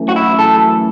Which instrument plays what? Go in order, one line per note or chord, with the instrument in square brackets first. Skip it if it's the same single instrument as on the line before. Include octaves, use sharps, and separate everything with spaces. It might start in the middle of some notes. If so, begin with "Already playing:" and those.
Already playing: [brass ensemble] F#2 E3 A3
[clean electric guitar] F#4
E4
A4